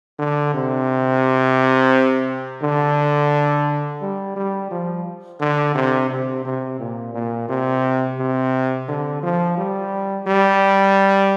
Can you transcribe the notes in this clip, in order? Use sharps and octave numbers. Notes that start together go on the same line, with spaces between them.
D3
C3
D3
G3
G3
F3
D3
C3
C3
C3
A#2
A#2
C3
C3
D3
F3
G3
G3